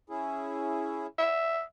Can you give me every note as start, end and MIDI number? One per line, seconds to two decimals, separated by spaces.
0.10 1.06 61
0.10 1.06 64
0.10 1.06 68
1.18 1.62 76